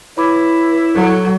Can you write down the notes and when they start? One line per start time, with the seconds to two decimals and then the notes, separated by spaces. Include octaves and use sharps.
0.17 E4 B4 C#5 B5 D6
0.94 F#3 A4